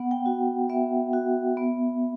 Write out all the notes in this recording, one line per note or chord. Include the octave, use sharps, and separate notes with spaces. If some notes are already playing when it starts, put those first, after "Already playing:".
Already playing: B3 F#5
G5
F#4
B3 E5
F#4
B3